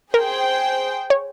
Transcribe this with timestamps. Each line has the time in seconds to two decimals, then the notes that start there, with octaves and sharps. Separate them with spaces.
0.14 G#4 A#4 C5 G5
1.10 C#5